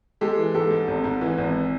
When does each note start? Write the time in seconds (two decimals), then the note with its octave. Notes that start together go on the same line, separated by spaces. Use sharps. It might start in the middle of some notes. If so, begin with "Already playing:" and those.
0.21 G#3 G4 A4
0.38 E3
0.54 G#2 G4 A4
0.71 G#2
0.87 G#1
1.04 G#2
1.21 E3
1.38 G#1